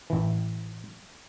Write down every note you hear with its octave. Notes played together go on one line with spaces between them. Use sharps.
A1 E3